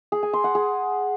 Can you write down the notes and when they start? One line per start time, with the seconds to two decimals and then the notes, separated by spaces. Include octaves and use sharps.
0.12 G#4
0.23 G#5
0.33 C6
0.44 F#5
0.55 G#4